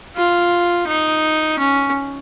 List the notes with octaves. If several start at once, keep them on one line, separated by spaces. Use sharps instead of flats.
F4
D#4
C#4